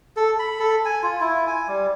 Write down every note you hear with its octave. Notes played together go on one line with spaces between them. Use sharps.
A4
B5
A4
G#5
F4
E4
G#5
G3